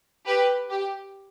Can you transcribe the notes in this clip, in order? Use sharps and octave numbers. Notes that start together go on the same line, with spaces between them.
G4 B4
G4